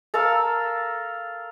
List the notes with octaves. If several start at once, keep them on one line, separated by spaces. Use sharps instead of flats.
A4 A#4 F5 E6